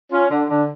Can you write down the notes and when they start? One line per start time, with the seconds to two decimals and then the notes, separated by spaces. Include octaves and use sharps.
0.12 C#4 F4
0.30 D3 D4
0.49 D3 D4